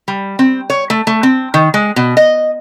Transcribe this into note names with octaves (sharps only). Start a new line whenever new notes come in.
G3
C4
C#5
A3
A3
C4
D#3
G#3
B2
D#5